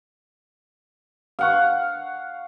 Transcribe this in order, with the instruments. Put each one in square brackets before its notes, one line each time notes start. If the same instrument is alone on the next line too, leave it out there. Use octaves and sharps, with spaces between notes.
[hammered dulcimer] F5 F#5 C#6